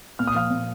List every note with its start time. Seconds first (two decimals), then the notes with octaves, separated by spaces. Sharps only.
0.19 A#2 F6
0.28 D#6
0.35 F3 F5 F6
0.51 A#2